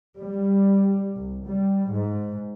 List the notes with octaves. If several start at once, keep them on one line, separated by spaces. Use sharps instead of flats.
G3
C2
G3
G#2